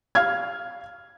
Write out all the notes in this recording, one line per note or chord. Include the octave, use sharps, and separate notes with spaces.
F5 F6 G#6